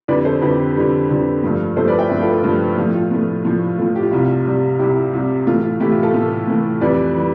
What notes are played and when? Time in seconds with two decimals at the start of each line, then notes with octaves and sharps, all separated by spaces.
0.08 F2 D3 G3 B4 D5
0.25 A4 C5
0.42 F2 D3 G3 G4 B4
0.76 F2 D3 G3
1.09 F2 D3 G3
1.43 G2 F3 A3
1.76 G2 F3 A3 A4 C5
1.88 B4 D5
1.99 E5 G5
2.10 G2 F3 A3
2.21 F4 A4
2.32 F4 A4
2.44 G2 F3 A3
2.77 A2 F3 A3 F4
2.95 F4
3.11 A2 F3 A3
3.45 A2 F3 A3
3.78 A2 F3 A3 F4
3.95 G4
4.03 F4
4.11 C2 C3 G3 E4
4.18 F4
4.46 C2 C3 G3
4.79 C2 C3 G3 E4 G4
5.13 C2 C3 G3
5.47 A2 E3 A3 F4
5.63 F4
5.80 A2 E3 A3 E4 G4
5.91 F4
6.03 F4 A4
6.14 A2 E3 A3
6.47 A2 E3 A3
6.81 F2 E3 G3 B4 D5
7.16 E3 G3